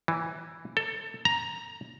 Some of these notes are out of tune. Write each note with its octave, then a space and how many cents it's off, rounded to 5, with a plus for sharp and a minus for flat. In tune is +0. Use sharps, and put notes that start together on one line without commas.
E3 +0
A4 +20
A#5 +5